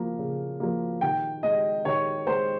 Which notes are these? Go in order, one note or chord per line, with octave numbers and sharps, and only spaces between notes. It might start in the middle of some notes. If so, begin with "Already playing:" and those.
Already playing: F3 A#3
C#3
F3 A#3
D#3 G5
G#3 D#5
D#3 C#5
G#3 C5